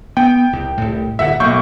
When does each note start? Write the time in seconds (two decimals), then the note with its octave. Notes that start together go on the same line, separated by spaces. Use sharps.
0.17 B3 G5
0.53 C2
0.77 C2 A2
1.19 D1 G1 E5 F#5
1.40 B1 A3 A#3 C#6 G6